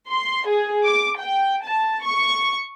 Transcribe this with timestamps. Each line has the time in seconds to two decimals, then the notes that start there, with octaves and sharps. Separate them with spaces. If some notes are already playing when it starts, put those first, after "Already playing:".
0.10 C6
0.47 G#4
0.86 D6
1.20 G5
1.65 A5
2.05 C#6